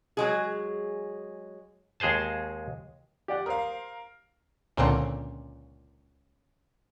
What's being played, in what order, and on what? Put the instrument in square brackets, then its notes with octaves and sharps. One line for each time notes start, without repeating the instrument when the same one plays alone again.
[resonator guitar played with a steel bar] F#3 G#3 G#4
[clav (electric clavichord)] D#2 G#3 G#4 C5 A5
[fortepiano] G4 D5 F#5
[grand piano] A#4 F5 [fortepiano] C5 D#6
[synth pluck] C#2 A#2 D3 C4